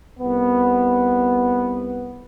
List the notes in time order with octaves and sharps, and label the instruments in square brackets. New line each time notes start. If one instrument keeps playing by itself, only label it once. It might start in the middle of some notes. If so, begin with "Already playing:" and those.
[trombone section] C2 B3